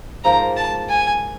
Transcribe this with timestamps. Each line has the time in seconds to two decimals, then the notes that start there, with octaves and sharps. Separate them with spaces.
0.24 G#2 F3 A#3 A#5
0.57 A5
0.90 G#5